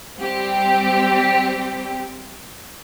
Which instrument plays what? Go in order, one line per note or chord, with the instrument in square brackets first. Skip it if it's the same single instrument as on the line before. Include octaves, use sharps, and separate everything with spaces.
[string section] G3 C4 G4